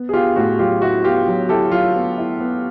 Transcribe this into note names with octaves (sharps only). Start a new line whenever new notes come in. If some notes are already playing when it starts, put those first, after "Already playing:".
Already playing: B3
G#4
B3 F4 G4
A2 F#4
F#3 F4 G4
E4 F#4
B3 F4 G4
F#3
E4 G4 A4
F#3 F4
B3
E4
B3